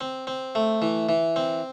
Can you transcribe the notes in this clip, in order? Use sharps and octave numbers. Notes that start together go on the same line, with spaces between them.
C4
C4
A3
E3
E3
C4